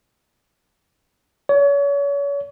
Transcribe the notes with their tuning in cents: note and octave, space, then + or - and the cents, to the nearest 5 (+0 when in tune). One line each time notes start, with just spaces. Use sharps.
C#5 +35